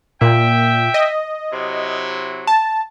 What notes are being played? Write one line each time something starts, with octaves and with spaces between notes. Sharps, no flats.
A#2 E5 G5
D#5
C3 F#3 E4
A5